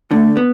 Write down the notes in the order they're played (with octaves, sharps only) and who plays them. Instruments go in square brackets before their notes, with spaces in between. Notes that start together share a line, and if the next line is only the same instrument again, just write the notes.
[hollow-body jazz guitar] D3 [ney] A3
[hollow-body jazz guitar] B3